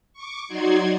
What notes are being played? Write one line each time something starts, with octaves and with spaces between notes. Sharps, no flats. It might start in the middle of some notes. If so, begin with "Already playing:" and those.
C#6 D6
F#3 D#4 F#4 D5 C6 G#6